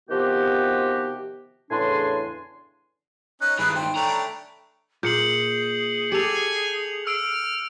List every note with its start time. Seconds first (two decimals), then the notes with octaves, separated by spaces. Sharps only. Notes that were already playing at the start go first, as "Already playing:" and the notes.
0.10 C3 D#3 F3 B3 F#4 G4
1.71 E2 A2 C#3 D4 G#5 C6
3.41 C#4 D#4 F#6
3.59 G2 D#3 E4 G#4 B4 F#6
3.76 C5 G5
3.95 A3 D4 C#5 A#5 B5
5.03 A#2 G#4 G6 C#7 F#7
6.12 G4 A4 G#5 C#7 F7
7.07 E6 F6 D7